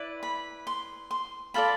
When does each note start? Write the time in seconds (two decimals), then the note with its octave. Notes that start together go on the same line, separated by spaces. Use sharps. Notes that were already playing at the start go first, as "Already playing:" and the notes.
Already playing: E4 B4 D5
0.23 B5
0.67 C6
1.11 C6
1.54 F4 A4 D5 B5